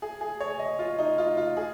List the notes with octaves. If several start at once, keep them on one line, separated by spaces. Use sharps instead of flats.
G#4
G#4
C#5
D#5
F4
D#4
F4
F4
G#4